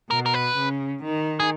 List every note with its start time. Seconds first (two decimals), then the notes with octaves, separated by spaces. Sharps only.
0.10 B2 A#4
0.26 A#4
0.34 B4
0.56 C#3
1.03 D#3
1.40 G#4